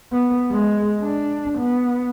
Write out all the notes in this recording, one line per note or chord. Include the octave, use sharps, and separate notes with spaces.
B3
G#3
D4
B3